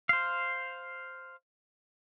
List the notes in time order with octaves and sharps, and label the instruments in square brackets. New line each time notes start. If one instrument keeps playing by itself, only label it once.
[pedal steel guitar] C5 F5